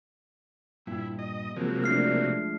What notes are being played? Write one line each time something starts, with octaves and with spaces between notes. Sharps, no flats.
G2 A#2 E4
D#5
C3 F3 F#3 G#3 A#3
A3 D4 F6 C7